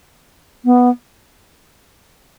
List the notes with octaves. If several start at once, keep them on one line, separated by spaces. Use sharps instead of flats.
B3